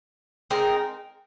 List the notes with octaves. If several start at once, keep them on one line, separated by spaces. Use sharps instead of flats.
G#3 C4 D#4 A#4